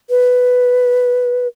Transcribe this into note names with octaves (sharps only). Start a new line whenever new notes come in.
B4